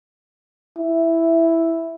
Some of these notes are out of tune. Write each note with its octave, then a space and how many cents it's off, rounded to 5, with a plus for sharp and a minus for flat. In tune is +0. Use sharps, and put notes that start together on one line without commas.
E4 +0